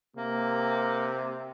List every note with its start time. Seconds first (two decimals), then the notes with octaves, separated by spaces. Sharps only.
0.16 C3 A#3